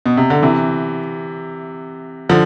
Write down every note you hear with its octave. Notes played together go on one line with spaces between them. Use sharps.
B2
C3
D3
C3 E3
D3 F3